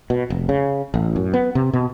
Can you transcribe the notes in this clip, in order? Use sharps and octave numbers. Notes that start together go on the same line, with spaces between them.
B2
F1
C#3
A1
F#2
B3
C3
B2